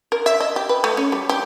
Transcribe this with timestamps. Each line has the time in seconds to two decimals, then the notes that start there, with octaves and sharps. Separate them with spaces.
0.12 A#4
0.26 E5
0.40 D#5
0.56 G4
0.69 B4
0.84 A3
0.97 C#4
1.12 G3
1.29 G4